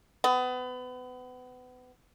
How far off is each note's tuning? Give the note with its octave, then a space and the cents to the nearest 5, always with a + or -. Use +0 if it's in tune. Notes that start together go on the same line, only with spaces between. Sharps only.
B3 +30